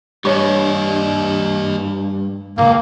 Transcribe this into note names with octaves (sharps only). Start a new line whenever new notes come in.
G2 G4 C#5 D#5 A5 C#6
C#2 G2 A#3